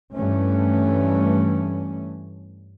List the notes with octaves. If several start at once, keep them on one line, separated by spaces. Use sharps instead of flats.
G2 E3 A3 C#4